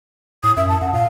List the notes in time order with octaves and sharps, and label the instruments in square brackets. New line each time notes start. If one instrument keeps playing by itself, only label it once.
[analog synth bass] A2 [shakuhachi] D#6
[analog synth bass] F#2 [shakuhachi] E5
[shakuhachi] A5
[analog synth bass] F#2 [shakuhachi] F#5
[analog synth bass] A#2 [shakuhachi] F5